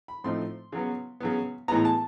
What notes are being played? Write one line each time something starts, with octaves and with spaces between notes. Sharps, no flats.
B5
A2 F3 A3 C4 D#4 C6
C#3 F#3 B3
C#3 F#3 B3
A2 E3 G#3 B3 A#5
A5